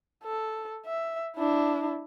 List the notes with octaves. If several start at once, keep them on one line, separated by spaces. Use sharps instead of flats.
A4
E5
D4 E4